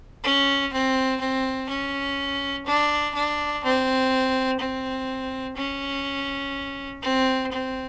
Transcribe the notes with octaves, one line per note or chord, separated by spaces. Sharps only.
C#4
C4
C4
C#4
D4
D4
C4
C4
C#4
C4
C4